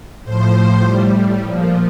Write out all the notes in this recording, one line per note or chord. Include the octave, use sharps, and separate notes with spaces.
A2 F3 C5
A2 G3
A#2 F3